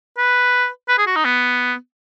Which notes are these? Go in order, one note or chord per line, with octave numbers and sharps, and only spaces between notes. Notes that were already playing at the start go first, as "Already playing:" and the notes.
B4
B4
G#4
F#4
D#4
B3